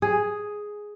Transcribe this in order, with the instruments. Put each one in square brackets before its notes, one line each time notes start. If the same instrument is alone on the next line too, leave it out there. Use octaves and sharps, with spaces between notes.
[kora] G#4